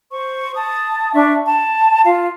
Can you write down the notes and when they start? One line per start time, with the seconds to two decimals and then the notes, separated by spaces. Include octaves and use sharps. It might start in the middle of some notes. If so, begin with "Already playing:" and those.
0.10 C5 C#6
0.54 A5 D#6
1.14 D4 E5 C#6
1.46 A5
2.04 F4 F5